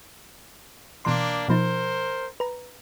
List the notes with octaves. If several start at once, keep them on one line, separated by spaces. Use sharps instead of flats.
B2 E3 A#3 D4 C6
B2 F3 D#4 A#4 C5
B4 A#5